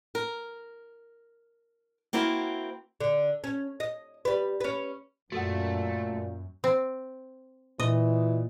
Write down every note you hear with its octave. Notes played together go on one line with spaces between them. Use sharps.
A#4
A#3 C4 E4 F#4 A#4
D3
C#4
D#5
G3 B4
C#4 B4
F#2 A#2 A3 F#4 A4 F#5
C4
A#2 E3 D#5